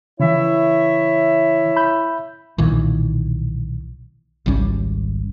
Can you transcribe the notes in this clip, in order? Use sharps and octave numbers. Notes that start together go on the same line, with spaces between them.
C#3 E3 E4 C#5 E5
B5 G6
B1 A#2 D#3 E3
G#1 C#2 G3 C#4